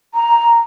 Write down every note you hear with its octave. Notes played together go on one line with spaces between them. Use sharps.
A#5